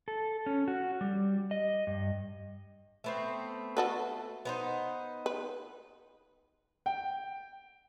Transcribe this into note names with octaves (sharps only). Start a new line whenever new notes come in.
A4
C#4
F#4
G3
D#5
G2
A3 B3 C4
F#4 A4 B4
B3 D#4 C5
B4
G5